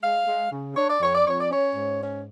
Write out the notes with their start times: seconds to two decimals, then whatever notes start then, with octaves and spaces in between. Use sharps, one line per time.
0.01 G#3 F5
0.27 G#3
0.51 C#3
0.76 D4 C#5
0.88 D5
1.00 F2 C#5
1.14 D5
1.25 F2 C#5
1.39 D5
1.49 C#4 C#5
1.74 G#2
1.99 C#4